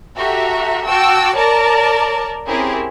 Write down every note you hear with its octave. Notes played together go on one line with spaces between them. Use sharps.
F#4 G4 A4 E5 A#5
F#4 G5 A5 D6 E6
A#4 C#5 D5 A5 A#5
C4 C#4 E4 G4 G#4 A#4